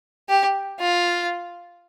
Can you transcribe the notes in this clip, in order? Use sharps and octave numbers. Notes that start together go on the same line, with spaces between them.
G4
F4